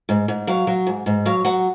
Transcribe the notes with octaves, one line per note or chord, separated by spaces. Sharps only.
G#2
G#2
F#3 F5
F#3
G#2
G#2
F#3 F5
F#3 F#5